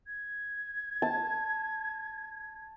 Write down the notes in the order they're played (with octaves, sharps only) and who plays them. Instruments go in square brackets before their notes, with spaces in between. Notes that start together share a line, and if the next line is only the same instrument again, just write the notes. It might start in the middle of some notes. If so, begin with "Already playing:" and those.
[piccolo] G#6
[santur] A5